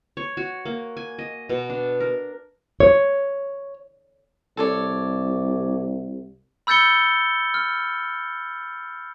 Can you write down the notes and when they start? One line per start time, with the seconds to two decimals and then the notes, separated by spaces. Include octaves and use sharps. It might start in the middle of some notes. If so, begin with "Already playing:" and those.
0.17 C#5
0.37 F#4
0.65 A#3
0.97 G#5
1.19 D#5
1.49 B2
1.70 D4
2.00 A#4
2.80 C#5
4.57 C2 A4 C#5 D5
6.67 B5 E6 G6 A6 C#7 G7
7.54 F6